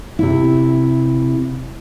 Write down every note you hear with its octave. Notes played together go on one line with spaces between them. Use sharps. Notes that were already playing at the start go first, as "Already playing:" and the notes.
C3 E4